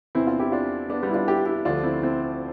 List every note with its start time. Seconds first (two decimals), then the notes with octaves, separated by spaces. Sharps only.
0.15 E2 C3 E3 C4 E4
0.27 D4 F4
0.39 E4 G4
0.52 D4 F4
0.89 B3 D4
1.03 G3 B3
1.09 E4
1.14 D4 F4
1.28 E4 G4
1.46 E4 G4
1.65 D2 D3 F3 D4 F4
1.83 C4 E4
2.02 C4 E4